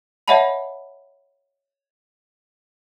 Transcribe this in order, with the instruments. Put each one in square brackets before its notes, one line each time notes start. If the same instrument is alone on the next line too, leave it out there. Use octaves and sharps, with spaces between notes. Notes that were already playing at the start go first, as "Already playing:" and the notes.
[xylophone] C#5 D#5 E5 F#5 A5 B5